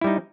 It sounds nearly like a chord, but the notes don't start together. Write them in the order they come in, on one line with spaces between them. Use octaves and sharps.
E4 G3 D#4